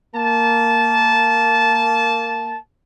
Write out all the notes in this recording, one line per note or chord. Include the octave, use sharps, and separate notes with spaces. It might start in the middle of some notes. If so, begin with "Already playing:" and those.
A#3 A5